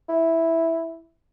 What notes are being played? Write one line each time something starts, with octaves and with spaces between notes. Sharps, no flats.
E4